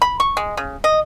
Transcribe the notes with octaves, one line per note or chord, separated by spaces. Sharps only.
B5
C#6
G#3
C#3
D#5